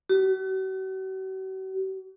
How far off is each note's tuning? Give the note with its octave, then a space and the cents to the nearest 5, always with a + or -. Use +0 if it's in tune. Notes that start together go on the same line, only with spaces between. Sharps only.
F#4 +45